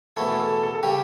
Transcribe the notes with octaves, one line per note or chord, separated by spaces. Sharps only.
E2 B2 A3 C#4 E4 A4
A4
A4
A4
C#3 G3 C#4 G4